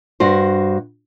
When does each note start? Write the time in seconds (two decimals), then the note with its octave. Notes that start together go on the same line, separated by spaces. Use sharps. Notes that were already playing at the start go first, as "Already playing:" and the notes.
0.20 G2 F#4 C5